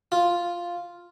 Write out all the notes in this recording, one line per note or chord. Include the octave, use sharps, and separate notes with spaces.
F4